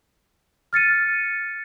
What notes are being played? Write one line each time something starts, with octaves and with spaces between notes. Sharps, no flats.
F6 A6 C#7 D#7